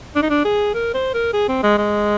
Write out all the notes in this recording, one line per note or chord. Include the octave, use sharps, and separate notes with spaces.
D4
D#4
D4
G#4
A#4
C5
A#4
G#4
C4
G#3
G#3